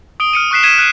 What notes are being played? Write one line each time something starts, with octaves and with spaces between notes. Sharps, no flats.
D#6 D7 G7
F6 C#7 D#7
C#6 D#6 F#6 B6 C7 E7
G#6 B6 D#7 E7 G7
F#6 D#7